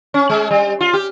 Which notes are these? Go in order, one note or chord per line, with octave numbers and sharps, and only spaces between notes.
C#4
G#3
G3
F4
G4